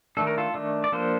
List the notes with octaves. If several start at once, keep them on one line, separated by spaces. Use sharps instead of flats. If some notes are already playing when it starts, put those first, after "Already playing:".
D#3 A3 D4 A4
A#4
F4 A4
D#3 A3 D4
D5
F3 A#3 D4 A4 C5